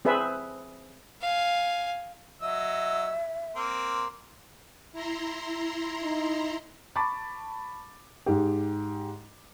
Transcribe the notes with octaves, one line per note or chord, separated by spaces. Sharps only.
C4 G#4 B4 E5
F5 G#5
F#3 D#5 E5 E6
A#3 C4
E4 A#5 C6
D#4
A5 B5 C#6 D6 A6
G#2 G4